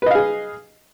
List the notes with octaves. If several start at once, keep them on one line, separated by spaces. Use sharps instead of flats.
G#4 B4 D#5 F5